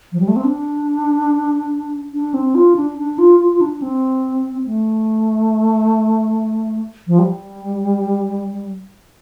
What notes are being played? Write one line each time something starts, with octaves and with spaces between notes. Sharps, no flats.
F3
G3
A3
C4
D4
D4
C4
F4
D4
D4
F4
F4
F4
D4
C4
A3
F3
G3